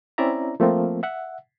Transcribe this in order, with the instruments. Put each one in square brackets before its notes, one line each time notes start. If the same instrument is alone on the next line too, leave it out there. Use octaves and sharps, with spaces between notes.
[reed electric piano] C4 C#4 E4 D5 E5 A#5
F3 A3 A#3 C4
E5 F#5